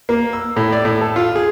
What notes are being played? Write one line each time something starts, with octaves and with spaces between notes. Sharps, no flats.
A#3
E6
A2
D5
A2
A4
F4
G#4